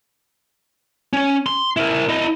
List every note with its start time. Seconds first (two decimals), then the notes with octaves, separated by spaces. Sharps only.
1.13 C#4
1.47 C6
1.77 E4 A#4
2.09 E4 D#5